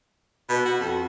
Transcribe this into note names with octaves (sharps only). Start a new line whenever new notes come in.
B2
F#4
F2